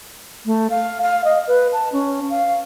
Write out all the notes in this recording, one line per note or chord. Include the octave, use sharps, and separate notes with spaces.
A3
F5
F5
D#5
B4
A5
C#4
F5